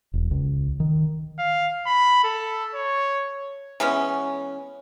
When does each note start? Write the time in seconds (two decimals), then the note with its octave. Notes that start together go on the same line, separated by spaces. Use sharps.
0.14 E1
0.31 C#2
0.80 D#3
1.39 F5
1.86 B5
2.24 A4
2.74 C#5
3.80 E3 G#3 B3 C#4